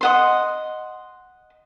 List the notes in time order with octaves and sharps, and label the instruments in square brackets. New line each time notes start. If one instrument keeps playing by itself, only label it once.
[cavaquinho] D#5 F#5 C6